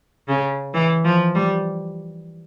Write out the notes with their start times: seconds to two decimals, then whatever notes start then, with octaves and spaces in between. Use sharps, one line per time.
0.28 C#3
0.74 E3
1.05 F3
1.35 G3